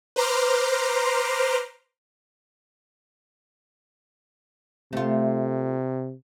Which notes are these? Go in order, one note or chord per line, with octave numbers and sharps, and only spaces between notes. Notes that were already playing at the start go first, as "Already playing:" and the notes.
B4 C5 A#5 C6 D6 F6
C3 A3 F4